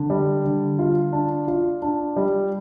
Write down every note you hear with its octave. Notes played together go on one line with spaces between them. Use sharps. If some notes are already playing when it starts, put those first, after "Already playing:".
Already playing: D3
G3
D3
F4
D4
F4
D4
G3